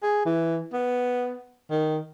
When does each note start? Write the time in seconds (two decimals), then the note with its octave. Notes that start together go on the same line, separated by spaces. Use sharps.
0.03 G#4
0.26 E3
0.73 B3
1.71 D#3